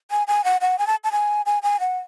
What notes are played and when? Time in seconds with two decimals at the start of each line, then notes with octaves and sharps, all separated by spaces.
0.11 G#5
0.27 G#5
0.44 F#5
0.61 F#5
0.78 G#5
0.87 A5
1.04 A5
1.12 G#5
1.46 G#5
1.63 G#5
1.80 F#5